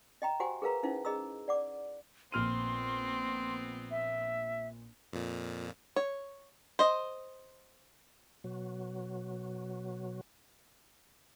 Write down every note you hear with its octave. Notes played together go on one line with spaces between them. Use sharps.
D#5 G5 A#5
F#4 G4 C5 F#5 G#5
G#4 A#4 B4 F5 A#5
C#4 D#4 E4 C5 F5
G#4 D#5 A#5 E6
D5 F#5 D6
A#1 B3 C4 C6 F6 D#7
E5
F2 A#2
C#5
C5 D#5
B2 F#3